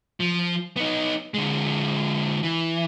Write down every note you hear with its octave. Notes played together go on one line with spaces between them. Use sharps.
F3
B3 D#4
D3 G#3
E3